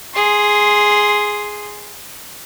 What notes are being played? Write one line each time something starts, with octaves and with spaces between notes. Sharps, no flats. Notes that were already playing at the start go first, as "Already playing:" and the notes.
G#4 C6